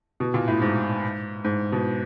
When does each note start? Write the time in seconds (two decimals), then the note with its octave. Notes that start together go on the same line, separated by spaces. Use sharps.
0.20 B2
0.34 A#2
0.48 A2
0.61 G#2
1.44 G#2
1.72 B2